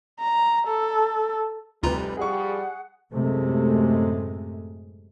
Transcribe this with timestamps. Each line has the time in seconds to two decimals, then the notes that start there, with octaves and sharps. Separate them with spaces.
0.20 A#5
0.68 A4
1.83 F1 D2 C3 G3 F4 B4 A#5
2.17 G2 F3 G3 G#4 F#5 C#6
3.12 F#2 A2 C3 G#3 A3